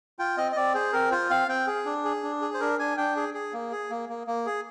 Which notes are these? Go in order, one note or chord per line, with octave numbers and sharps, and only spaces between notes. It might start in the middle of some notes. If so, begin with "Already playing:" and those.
F4 G5
C4 D#5
D#5
C4 D5
G#4 C5
C4 A#4
F4 C5
C4 F5
C4 G5
G#4
D4
G#4
D4
G#4
C5
D4 A#4
D4 G#5
D4 G5
G#4
G#4
A#3
G#4
A#3
A#3
A#3
G#4